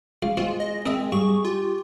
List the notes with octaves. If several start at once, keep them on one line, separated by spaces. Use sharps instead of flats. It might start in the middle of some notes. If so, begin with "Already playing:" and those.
C#2 F5
G#3 C4 F4 F#4 F5
D#5
C4 A#4 D#5 E5
G2 G#4 C#6
F4 G4